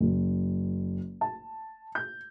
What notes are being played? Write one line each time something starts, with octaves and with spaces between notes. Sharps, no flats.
F#1
A5
G6